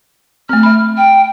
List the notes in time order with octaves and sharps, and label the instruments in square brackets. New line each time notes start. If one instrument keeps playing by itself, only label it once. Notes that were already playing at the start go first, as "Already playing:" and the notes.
[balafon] A3 C4 [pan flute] F6
[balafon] E5 B5
[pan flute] G5